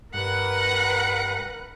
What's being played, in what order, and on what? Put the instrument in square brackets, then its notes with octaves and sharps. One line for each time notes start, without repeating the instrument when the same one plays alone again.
[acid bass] G2 [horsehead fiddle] A#4 B4 [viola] F#5